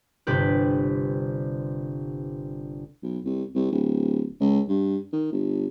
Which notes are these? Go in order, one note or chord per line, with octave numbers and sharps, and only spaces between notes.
G1 C3 G4 B4
B1
C2
C2
D1
C#2
G2
D#3
G1